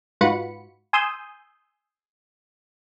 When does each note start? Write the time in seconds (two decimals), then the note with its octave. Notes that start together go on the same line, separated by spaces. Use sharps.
0.21 G#2 F4 F#4 B4 B5 C#7
0.93 G#5 C6 D#6 E6 G6